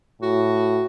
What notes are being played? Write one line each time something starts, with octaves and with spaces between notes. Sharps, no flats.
A2 F#4